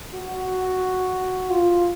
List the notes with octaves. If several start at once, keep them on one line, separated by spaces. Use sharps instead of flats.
F#4
F4